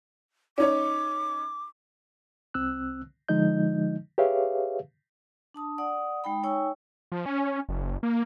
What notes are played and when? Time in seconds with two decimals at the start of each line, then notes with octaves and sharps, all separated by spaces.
0.58 C#4 D#4 C#5 D6
2.54 C2 C4 E6 F#6
3.29 D3 F3 G#3 D#4 D#5 G6
4.18 G4 G#4 B4 C#5 E5 F5
5.54 D4 A5 D#6
5.78 D5 F#5 D#6
6.24 G#3 D#4 G5 B5
6.44 D#4 C#5 G5 G#5 C#6 E6
7.12 F3
7.26 C#4
7.69 F#1
8.03 A#3